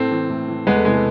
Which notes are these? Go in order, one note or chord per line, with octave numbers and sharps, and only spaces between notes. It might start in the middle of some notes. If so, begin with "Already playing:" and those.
Already playing: A2 A3 C4
E3
A2
E3
E2 G#3 B3
A3
C3 E3 G#3
A3